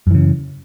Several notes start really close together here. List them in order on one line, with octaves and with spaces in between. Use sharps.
F#2 E3 C#3